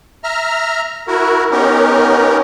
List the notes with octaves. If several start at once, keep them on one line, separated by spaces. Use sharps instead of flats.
E5 A#5 F6
E4 F#4 A#4
B3 C#4 D#4 G4 A#4